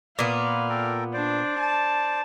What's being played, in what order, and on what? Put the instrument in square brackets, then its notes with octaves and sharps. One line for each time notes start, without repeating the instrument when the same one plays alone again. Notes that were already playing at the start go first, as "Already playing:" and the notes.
[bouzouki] A#2 B3 [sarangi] F5
[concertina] A4 A#4 G5
[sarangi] D4 [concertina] C5 D5
[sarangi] A5